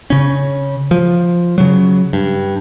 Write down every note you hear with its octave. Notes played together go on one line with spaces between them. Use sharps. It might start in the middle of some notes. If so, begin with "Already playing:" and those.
C#3 C#4
F3
C#3 F#3
G2